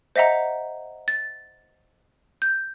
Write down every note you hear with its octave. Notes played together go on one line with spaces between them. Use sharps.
C5 D#5 E5 F#5 A#5
A6
G6